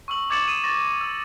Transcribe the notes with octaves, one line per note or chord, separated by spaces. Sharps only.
C#6 E6 F#7
D6 G#6 A6 C#7 E7 F#7
D#6 D#7 E7
C#6 A6 A#6
E6